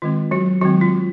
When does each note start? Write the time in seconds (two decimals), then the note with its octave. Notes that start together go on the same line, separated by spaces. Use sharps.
0.02 D#3 G#3 C4 F4
0.31 F#3 F#4
0.61 D#3 F#3 G#3 C4 F#4
0.81 F4